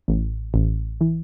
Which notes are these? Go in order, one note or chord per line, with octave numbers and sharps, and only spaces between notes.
A1
A1
E3